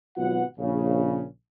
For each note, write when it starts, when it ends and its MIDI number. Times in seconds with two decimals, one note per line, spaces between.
0.16 0.44 32
0.16 0.44 47
0.16 0.44 54
0.16 0.44 65
0.16 0.44 71
0.16 0.44 78
0.59 1.22 34
0.59 1.22 49